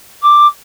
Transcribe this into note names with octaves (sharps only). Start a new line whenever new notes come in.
D6